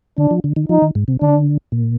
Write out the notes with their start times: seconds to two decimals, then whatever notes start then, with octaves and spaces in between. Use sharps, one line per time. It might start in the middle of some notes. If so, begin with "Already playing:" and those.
0.18 D3 D4
0.31 F3
0.44 D3
0.56 D#3
0.69 F3 D#4
0.82 D#3
0.95 G#2
1.08 C3
1.21 D3 D4
1.72 A#2